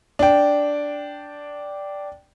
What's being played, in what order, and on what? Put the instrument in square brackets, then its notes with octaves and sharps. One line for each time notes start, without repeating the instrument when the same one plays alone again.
[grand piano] D4 G5